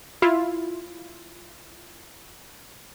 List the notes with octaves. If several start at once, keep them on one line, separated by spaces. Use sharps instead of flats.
E4 F4